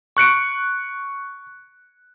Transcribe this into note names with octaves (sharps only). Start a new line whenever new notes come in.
C#6 F#6 C#7 D7